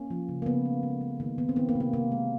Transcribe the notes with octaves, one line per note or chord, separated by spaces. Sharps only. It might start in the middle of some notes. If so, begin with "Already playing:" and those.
Already playing: A#3 C#4
F3
C#3
A#3
C#3 B3
A3
G#3
G#3
D#3 A#3
D#3 B3
C4
D#3 B3
A#3
C3
A#3
C3 A#3
G#3